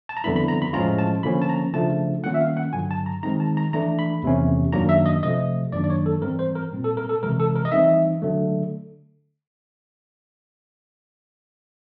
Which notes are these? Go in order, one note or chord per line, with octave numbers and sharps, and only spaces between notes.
A5
A#5
F2 D3 G3 B3 E4 B5
B5
A#5
B5
A2 F3 G#3 C#4 F4 A#5
A5
D3 F3 A#3 C#4 B5
A5
A#5
C#3 F3 A3 D4 F4 A5
D#3 G3 A#3 C#4 F4 F#5
E5
F5
F#5
G2 D3 F#3 G#5
A5
A#5
D#3 G#3 C4 D#4 A#5
A5
A#5
E3 A3 D4 A#5
B5
E2 C3 E3 A3 C#4
F#2 D#3 F#3 A#3 D4 A#5
E5
D#5
C3 F3 A3 D#5
F#2 D#3 F#3 A#3 D4 D5
D5
C#5
A4
G#2 E3 G3 C4 A#4
C5
A#4
A#2 G3 C4
A4
A#4
A4
C3 E3 G#3 A#4
A4
A#4
D#5
E3 G3 C4 D#4 E5
D3 F#3 A3